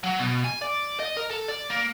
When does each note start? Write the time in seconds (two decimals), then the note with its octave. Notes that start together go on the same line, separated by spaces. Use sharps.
0.04 F#3
0.19 B2
0.44 G#5
0.61 D5
0.99 D#5
1.17 A#4
1.31 A4
1.49 D5
1.70 A#3